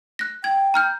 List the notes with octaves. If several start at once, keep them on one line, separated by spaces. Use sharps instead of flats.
F#6 A#6
G5 G#6
A#5 F6 G6